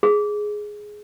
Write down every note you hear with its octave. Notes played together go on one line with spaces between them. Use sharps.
G#4